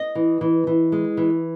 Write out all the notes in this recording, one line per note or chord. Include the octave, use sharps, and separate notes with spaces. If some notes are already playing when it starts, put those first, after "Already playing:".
Already playing: D#5
E3
E3
E3
G#3
E3